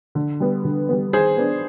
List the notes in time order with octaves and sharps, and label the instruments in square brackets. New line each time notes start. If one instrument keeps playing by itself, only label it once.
[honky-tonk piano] D3
G3 B3
D3
G3 B3
[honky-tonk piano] D#3 [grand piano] G#4 C5
[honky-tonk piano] B3 D4